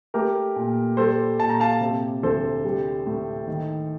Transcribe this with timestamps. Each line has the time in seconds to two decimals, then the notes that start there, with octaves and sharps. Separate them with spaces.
0.14 A3 G4 A#4
0.56 A#2
0.97 G3 A4 C5
1.40 A#2 A5
1.49 A#5
1.60 F5 A5
1.81 C3
2.23 D2 A4 C5
2.64 G3
3.07 A2
3.47 D#3